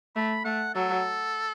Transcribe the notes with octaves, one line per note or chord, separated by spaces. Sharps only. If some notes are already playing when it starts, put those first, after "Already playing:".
A3 B5
A3 F#5
F#3 A4